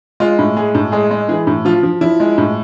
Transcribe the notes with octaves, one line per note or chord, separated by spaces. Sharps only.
G#3 F4
A2
G#3 G#4
A2
G#3 G#4
G#3
E3 G#4
A2
F3 F4
F3
F3 E4
G#3
A2